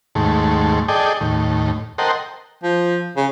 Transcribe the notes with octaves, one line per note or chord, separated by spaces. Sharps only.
D#2 G#2 A3
G#4 A4 D5 D#5 G5
D#2 A2
A4 A#4 C5 D#5 F#5 G5
F3
C#3